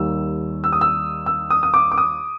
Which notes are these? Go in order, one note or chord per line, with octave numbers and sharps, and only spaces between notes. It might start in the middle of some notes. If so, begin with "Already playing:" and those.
Already playing: D#2 D#3 G3 E6
E6
D#6
E6
E6
D#6
D#6
D6
D6
D#6